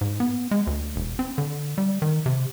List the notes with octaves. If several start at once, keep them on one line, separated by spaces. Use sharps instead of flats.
G#2
B3
G#3
D2
E1
C4
D3
G3
D#3
C3